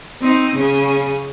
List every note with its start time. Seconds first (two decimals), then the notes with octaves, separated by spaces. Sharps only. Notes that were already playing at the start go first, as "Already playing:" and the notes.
0.21 C4 D#4
0.55 C#3 C#4